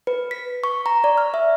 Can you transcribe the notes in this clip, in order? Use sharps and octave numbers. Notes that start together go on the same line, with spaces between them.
B4
B6
C#6
A#5
D5
F6
E5